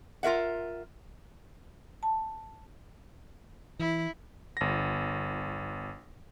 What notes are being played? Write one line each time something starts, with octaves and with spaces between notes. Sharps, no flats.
F4 A#4 E5 F#5
A5
E3 E4
G1 A#6